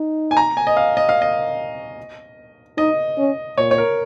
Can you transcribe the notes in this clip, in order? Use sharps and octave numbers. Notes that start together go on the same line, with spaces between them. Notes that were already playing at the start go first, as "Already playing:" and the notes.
Already playing: D#4
G#5
A#5
G#5
D#5
F5
D#5
F5
D#5
D#4 D#5
C#4
A#2 C#5
C#5
A#4